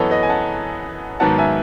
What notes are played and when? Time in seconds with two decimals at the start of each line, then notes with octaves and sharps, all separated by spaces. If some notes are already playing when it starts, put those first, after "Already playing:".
Already playing: F#2 E3 B3 A4 B4 C#5 D#5
0.11 B4 D#5
0.23 G#5
0.29 F#5 A5
1.20 G#2 D#3 F#3 B3 F#5 A5
1.38 E5 G#5